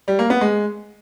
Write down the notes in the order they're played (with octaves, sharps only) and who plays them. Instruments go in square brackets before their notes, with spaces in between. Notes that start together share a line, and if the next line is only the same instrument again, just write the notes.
[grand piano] G3
A#3
B3
G#3